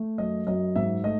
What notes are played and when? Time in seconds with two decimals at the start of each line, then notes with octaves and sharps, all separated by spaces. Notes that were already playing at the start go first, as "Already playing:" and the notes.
Already playing: A3
0.18 F#2 D#5
0.47 F#2 D#5
0.76 G#2 E5
1.04 A3 D#5